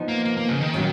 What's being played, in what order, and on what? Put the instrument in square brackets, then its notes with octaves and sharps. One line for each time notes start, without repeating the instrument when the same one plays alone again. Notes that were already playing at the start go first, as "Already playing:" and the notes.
Already playing: [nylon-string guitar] F3 B3 D#4
[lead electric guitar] A#3
A#3
A#3
C#3
D#3
[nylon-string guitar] A#2 F#3 C#4